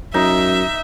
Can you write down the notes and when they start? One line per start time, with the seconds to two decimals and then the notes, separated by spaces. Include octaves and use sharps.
0.14 F#2 D#4 E5